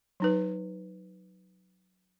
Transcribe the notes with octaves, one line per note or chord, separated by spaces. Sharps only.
F#3 D#4 B4